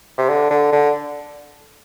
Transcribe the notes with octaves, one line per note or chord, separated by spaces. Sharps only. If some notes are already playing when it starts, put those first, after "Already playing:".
C3
D3
D3
D3